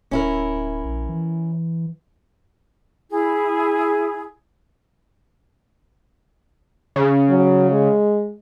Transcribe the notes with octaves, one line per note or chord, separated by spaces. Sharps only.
D1 C#4 E4 A#4
A#1
E3
E4 G#4
C#3
F#3
G#3